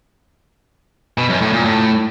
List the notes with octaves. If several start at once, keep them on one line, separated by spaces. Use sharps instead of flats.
B2
F#2
A2
A#2
A2